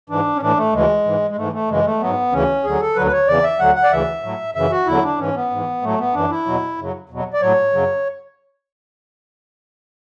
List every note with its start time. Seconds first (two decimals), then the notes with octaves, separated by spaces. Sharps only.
0.10 G#2 E3 D4
0.36 C#4
0.41 A2 E3 D4
0.57 A3
0.73 D2 C#3 E3 G#3
1.05 G#2 E3
1.31 G#3
1.37 G#2 E3 A3
1.53 A3
1.68 F#2 C#3 E3 G#3
1.85 A3
2.00 G#2 F#3 B3
2.32 D2 C#3 E3 C#4
2.64 D2 D3 F#3 G#4
2.80 A4
2.96 D2 D3 F#3 B4
3.07 B4
3.12 C#5
3.28 E2 C#3 E3 D5
3.43 E5
3.59 D2 D3 F#3 F#5
3.76 F#5
3.84 D5
3.91 D2 C#3 E3 E5
4.23 A2 F#3
4.55 F#2 C#3 E3 E5
4.71 F#4
4.87 E2 D3 F#3 E4
5.03 D4
5.18 G#2 E3 C#4
5.35 B3
5.50 G#2 E3
5.82 A2 F#3 A3
5.98 B3
6.14 F#2 E3 D4
6.30 E4
6.46 E2 B2 F#3
6.77 F#2 C#3 F#3
7.09 E2 B2 F#3
7.34 D5
7.41 A2 F#3 C#5
7.73 F#2 C#3 F#3